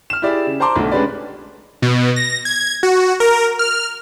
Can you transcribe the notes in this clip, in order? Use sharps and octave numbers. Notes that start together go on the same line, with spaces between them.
F6 E7
E4 G4 G#4 D5 E5
C#3
C5 A5 A#5 C6 D6
B1 D3 A3
G#3 C#4 D4 G4 B4 D5
B2
A#6
G#6
F#4
A#4
F6